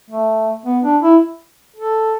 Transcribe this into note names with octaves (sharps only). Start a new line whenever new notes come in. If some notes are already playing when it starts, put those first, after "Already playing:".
A3
B3
D4
E4
A4